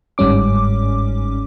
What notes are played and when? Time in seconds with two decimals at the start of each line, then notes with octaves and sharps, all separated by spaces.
0.18 G1 G#2 G3 C#4 D6